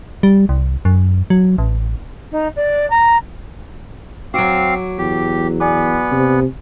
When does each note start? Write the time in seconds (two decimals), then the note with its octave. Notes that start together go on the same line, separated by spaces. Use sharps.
0.23 G3
0.49 C2
0.85 F#2
1.30 F#3
1.58 A1
2.32 D#4
2.56 D5
2.90 A#5
4.34 F#3 C4 F#4 F5 D6 D7
4.98 E2 G4
5.60 B3 B4 D5 G#5 D6
6.11 C3